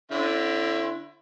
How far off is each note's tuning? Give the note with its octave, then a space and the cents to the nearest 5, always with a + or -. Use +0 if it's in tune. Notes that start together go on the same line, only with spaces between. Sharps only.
D3 +0 C#4 -45 E4 +25